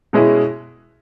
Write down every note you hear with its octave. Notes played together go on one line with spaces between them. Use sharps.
B2 G#3 C#4 E4 G#4